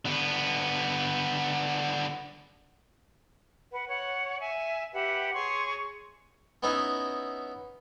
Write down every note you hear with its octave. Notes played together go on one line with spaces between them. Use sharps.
D3 B3
B4 F#5
C#5 F#5
E5 G#5
G4 B4 E5 F#5
G#4 C#5 C6 C#6
B3 C#4 D#4 E4 F#4